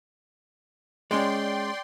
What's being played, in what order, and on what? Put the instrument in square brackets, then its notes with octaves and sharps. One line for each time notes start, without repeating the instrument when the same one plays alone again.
[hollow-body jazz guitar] G#3 C#4 [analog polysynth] D5 G5 C6